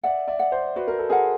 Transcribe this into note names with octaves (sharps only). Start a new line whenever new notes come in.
D5 E5 F#5
D5 E5
F#5
C5 D5
F#4 B4
A#4
A4
G#4 A#4 F#5